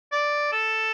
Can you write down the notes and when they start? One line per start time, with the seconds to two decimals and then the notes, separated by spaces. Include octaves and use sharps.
0.12 D5
0.52 A4